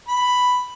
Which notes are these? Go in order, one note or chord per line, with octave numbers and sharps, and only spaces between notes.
B5